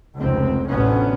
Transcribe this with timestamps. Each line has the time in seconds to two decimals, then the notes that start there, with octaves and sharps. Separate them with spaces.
0.18 F1 C#2 C4
0.68 A1 D2 C3 B3 C#4